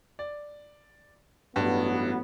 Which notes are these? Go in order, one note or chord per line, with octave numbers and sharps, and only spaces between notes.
D5
A1 G2 F#3 B3